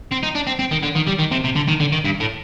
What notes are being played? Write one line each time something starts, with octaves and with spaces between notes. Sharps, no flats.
C4
D#4
D4
C4
C4
D#3
D3
D#3
G3
D#3
C3
C3
D3
D#3
D3
D#3
G2
A2